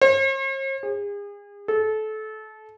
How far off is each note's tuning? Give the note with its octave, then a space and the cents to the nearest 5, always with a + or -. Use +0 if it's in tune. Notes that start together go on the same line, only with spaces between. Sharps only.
C5 +45
G#4 -40
A4 -25